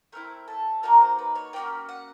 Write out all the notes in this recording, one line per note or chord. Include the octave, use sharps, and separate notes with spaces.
A3 C4 E4 A#4
A4
A#3 D#4 F#4 A#4
C5
B4
C#5
A#3 C#4 F#4 G5
F#5